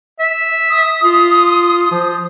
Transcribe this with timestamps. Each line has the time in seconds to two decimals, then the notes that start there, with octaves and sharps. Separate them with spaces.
0.19 E5
0.70 D#6
1.03 F4
1.91 F3